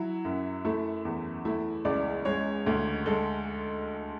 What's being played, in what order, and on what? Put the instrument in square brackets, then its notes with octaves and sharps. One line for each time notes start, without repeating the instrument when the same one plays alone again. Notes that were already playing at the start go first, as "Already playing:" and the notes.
Already playing: [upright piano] F#3 E4
F#2
A3 E4
E2
A3 E4
C#2 D5
G#3 C#5
D2
G#3 A4